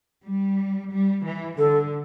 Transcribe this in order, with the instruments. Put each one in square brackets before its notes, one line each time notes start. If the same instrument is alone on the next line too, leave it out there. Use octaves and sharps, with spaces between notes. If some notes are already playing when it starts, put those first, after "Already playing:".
[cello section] G3
G3
E3
[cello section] D3 [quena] A4